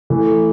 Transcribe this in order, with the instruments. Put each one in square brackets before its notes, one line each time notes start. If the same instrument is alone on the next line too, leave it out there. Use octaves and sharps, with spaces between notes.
[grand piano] E3 A3